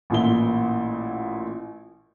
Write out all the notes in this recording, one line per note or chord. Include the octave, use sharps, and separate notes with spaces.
A1 A#2 E4 G7